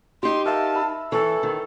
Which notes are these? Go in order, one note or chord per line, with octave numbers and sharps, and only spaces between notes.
D#4 G4 C6
A#4 E5 F5 A5
B5 E6
E3 A4 C#5
D#3